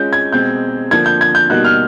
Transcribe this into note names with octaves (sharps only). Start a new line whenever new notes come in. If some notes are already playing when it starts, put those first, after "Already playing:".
Already playing: G#3 C#4 F4 G6
G#6
B2 G#3 C4 G6
D3 F3 A#3 D4 G#6
G6
G#6
G6
B2 G3 A#3 D#4 F#4 F#6
F6